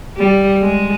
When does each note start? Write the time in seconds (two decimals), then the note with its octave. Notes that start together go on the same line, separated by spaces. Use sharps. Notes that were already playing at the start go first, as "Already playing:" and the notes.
0.17 G3
0.62 G#3